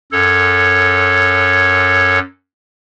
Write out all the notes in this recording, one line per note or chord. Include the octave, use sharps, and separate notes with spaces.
F#2 A4 C#5